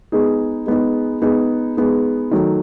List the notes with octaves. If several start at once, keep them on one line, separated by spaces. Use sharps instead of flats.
G#3 B3 D#4 G#4
G#3 B3 D#4 G#4
G#3 B3 D#4 G#4
G#3 B3 D#4 G#4
D#3 F#3 A3